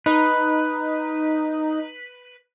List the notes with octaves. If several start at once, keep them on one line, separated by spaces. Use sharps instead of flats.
D#4 B4